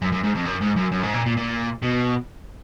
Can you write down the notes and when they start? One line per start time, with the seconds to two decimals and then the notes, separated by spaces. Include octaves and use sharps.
0.02 F#2
0.12 F#2
0.24 G#2
0.36 F2
0.46 F#2
0.62 G#2
0.77 F#2
0.92 F#2
1.03 G#2
1.14 A#2
1.26 A#2
1.37 A#2
1.83 B2